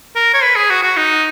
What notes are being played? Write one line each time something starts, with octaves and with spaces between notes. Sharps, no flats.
A#4
C#5
B4
G#4
F#4
F#4
D#4